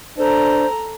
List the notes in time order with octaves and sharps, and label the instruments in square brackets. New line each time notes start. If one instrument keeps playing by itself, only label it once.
[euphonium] D4 [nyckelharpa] A4 A#5 [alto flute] C5